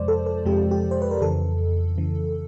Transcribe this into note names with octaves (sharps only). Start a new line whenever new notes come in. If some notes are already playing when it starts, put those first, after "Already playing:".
Already playing: F2 C3 F3 G#3 C5 D5
A4
A4
F2 C3 F3 G#3 G4
G4
C5
B4
A#4
F2 C#3 E3 A4
C#3 E3